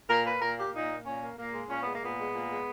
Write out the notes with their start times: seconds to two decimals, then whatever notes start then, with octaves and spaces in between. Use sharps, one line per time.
0.08 A#2 A#4
0.24 A#3 B4
0.40 A#2 A#4
0.56 A#3 G4
0.72 A#2 D#4
0.88 A#3
1.04 A#2 C#4
1.21 A#3
1.36 A#2 A#3
1.53 G#3
1.68 A#2 C#4
1.80 G#3 B3
1.92 A#3
2.01 A#2 B3
2.17 G#3
2.33 A#2
2.49 G#3